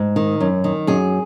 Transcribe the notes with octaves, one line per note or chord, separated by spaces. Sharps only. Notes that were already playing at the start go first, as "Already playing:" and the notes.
Already playing: G#2
D#3
F#2
D#3
F#2 G#4